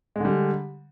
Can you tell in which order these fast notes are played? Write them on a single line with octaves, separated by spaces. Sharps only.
G#3 D3 G3